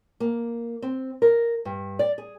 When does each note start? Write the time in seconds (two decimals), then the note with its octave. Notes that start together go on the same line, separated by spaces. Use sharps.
0.20 A#3
0.82 C4
1.22 A#4
1.65 G2
1.99 D5
2.18 G#4